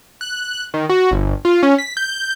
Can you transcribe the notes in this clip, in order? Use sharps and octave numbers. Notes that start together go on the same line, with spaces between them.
F#6
D#3
F#4
G1
F4
C#4
B6
G6